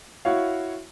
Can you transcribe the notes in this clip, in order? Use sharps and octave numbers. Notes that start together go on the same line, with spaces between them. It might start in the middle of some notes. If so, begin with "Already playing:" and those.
E4 F#4 C#5 F5